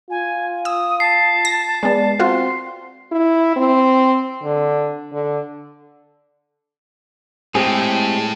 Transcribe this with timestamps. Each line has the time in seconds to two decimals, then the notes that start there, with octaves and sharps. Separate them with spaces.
0.10 F4 G#5
0.65 D#6 E6
1.00 A5 C7
1.45 A#6
1.83 G#3 B3 D5
2.19 C4 F4 F#4 C6
3.12 E4
3.56 C4
4.43 D3
5.12 D3
7.55 A2 G#3 C4 G4 G#4 G5